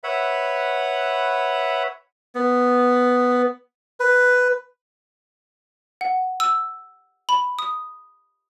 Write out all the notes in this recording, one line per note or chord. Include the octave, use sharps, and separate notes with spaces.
B4 C#5 E5 F#5 B5
B3
B4
F#5
E6
B5
D#6